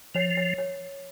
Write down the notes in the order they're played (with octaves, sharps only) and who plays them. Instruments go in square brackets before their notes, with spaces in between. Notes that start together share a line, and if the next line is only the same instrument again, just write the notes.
[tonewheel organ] F3 [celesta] C#5
[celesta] C#5
C#5